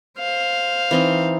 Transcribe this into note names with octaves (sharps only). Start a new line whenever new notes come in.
C5 F5
E3 C4 D#4